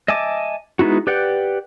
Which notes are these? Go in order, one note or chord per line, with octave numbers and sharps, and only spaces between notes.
D#5 E5 G#5 A5 D6
G#3 B3 D#4 E4 F#4
G4 B4 D5 F#5 G5